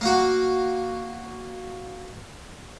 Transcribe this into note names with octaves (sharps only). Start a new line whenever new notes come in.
A#3 F#4